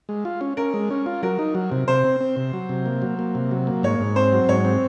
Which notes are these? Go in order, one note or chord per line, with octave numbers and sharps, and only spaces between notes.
G#3
F4
C#4
C#4 A#4
G#3
C#4
F4
F#3 A#4
D#4
F#3
C3
C3 C5
C4
C4
C3
F#3
C3
A#3
F#3
A#3
C3
F#3
A#3
G#2 C#5
G#2
C4 C5
F#3
G#2 C#5
C4